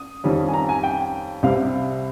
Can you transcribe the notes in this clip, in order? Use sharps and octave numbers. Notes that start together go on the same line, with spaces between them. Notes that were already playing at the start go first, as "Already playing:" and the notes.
Already playing: D#6
F2 D#3 G3 C#4
G#5
A#5
G#5
G5
C2 C3 G3 C4 F5